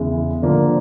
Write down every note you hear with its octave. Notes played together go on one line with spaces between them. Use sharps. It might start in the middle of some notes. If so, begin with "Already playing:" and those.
Already playing: E2 C#3 E3 G#3
D3 F3 A#3